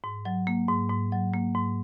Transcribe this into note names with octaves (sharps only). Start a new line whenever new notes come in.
G#2
F#3
A#3
G#2
G#2
F#3
A#3
G#2